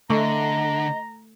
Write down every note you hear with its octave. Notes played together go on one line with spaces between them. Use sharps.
D3 A3 D#5 A#5